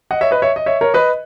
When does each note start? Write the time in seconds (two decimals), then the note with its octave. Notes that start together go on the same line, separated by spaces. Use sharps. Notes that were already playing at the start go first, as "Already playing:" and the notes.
0.11 D#5 F#5
0.21 C#5 E5
0.31 B4 D#5
0.42 C#5 E5
0.56 D#5
0.66 C#5 E5
0.81 A#4 C#5
0.94 B4 D#5